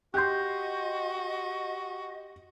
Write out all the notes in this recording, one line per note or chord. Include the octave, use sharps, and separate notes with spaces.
F#4 G4 D#5 C6 F#6 G6